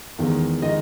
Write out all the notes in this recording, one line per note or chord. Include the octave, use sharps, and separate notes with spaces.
E2 D#3 G#3
D#3 G#3 D#5